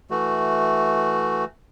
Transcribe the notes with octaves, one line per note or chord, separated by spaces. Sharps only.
E3 A3 F#4